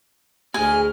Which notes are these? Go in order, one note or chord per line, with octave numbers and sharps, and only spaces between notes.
D2 G#3 G#4 G#5 F6